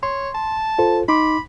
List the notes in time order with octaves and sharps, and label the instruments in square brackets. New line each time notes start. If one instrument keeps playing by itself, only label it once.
[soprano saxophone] C#5 [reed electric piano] C6
[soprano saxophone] A5
[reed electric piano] F4 A4 C5
[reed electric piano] D#4 C6 D6 [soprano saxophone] B5